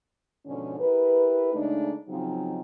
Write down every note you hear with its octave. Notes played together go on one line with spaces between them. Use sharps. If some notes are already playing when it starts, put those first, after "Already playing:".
G#2 B2 D3 F3 C#4
E4 G4 A#4 B4
C#3 G#3 A3 D4 D#4
C#3 F3 F#3 C4 D#4